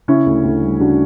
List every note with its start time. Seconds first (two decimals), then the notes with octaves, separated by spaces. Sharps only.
0.08 C#3 C#4 E4
0.26 D2
0.44 D2
0.62 G3
0.80 C#3 D4 F#4